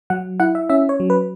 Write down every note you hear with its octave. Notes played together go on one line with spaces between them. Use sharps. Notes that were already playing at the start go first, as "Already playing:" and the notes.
F#3 F#5
E4 F#5
E5
C#4 E5
C#5
F#3
B4